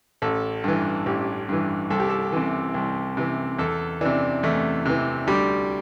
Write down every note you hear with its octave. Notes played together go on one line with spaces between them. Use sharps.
A1 A4
G2 E3
A1 G4
G2 E3
C2 A4
G4
A4
C3 E3
C2
C3 E3
E2 A4
C3 E3 D4
E2 A3
C3 E3
D2 G3